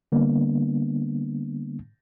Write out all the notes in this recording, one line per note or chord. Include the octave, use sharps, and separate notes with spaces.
D3 G3 A#3 B3 D4